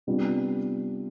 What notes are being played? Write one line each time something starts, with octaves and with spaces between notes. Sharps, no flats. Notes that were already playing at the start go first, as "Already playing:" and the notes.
C3 G3 B3 D4 F4